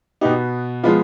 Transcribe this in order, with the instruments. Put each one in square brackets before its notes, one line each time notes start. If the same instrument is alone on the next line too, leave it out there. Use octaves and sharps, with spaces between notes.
[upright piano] B2 B3 D#4 G4
F3 G#3 B3 F4